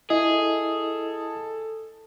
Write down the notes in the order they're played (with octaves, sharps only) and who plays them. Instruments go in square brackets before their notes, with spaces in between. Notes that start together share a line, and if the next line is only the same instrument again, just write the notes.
[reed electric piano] E4 D#5 [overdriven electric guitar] G#4 [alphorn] A4